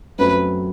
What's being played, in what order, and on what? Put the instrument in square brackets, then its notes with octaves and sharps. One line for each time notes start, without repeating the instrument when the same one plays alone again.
[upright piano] F#2 F#3 A3 C4 [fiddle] B4